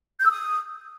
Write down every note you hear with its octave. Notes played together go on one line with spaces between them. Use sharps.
G6
E6
D#6